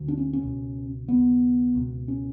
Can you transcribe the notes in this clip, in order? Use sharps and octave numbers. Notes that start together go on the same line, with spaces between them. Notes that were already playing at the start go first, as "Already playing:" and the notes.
Already playing: D2 D3
D4
C#4
C#4
C#2 B2
D#2 C#3 B3
C#2 B2
C#4